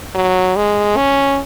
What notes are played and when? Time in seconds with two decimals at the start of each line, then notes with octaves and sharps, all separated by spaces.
0.15 F#3
0.56 G#3
0.97 C#4